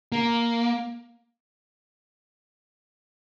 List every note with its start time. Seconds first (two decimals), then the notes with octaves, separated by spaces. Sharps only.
0.12 A#3